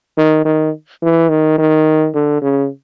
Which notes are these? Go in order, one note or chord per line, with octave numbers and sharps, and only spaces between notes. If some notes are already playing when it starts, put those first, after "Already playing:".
D#3
D#3
E3
D#3
D#3
D3
C#3